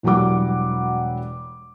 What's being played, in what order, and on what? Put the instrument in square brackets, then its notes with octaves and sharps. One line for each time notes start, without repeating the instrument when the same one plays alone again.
[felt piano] E1 E3 F#3 G3 F#5 D6